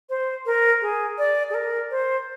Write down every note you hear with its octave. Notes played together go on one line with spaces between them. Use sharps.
C5
A#4
G#4
D5
G#4
A#4
C5